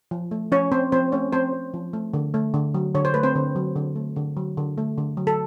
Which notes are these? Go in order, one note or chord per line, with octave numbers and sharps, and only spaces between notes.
F3
A3
F3 C#4 C#5
C4 C5
F3 C4 C5
A3 C#4 C#5
F3 C4 C5
C4
F3
A3
D3
A3
D3
F#3
D3 C#5
C5
A3 B4
C4 C5
D3
F#3
D3
A3
D3
F#3
D3
A3
D3
F#3
A4